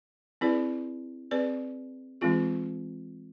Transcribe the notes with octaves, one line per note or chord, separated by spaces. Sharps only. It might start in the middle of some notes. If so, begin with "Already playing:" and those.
C4 E4 G#4 B4 D5
C4 G#4 B4 D5
E3 G#3 C4 F4 G#4